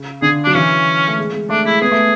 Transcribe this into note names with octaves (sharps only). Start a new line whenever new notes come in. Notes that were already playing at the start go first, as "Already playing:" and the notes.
Already playing: C#3
D3 G#4
D4
F#3
E3 C#4
A3
G#3
G#3
A3 D4
G#3 E4
B3 G#4
A3